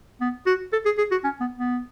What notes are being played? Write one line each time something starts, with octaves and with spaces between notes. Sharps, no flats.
B3
F#4
A4
G#4
G#4
F#4
C#4
B3
B3